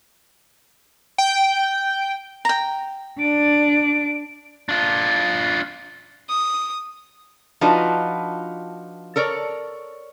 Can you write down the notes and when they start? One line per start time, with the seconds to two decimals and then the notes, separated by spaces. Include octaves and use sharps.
1.18 G5
2.45 G5 A#5
3.20 D4 D5 D7
4.69 D4 F4
6.29 D#6
7.61 F3 D4 D#4 F4 F#4 B4
9.16 A4 A#4 C#5 D5